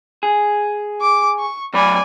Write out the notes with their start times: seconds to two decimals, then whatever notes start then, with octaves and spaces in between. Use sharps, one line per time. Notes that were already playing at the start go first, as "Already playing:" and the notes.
0.23 G#4
1.01 D6
1.39 C#6
1.74 A2 F#3 D5 G#5 B5